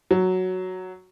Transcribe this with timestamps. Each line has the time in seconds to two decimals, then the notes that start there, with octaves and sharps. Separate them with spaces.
0.11 F#3